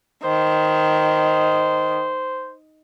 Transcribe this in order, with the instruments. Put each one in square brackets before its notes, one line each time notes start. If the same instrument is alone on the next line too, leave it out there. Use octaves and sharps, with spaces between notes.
[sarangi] D#3 [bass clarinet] C5